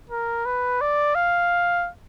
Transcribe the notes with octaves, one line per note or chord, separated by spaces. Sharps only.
A#4
B4
D5
F5